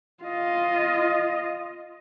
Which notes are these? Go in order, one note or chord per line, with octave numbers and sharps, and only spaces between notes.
F4 D#5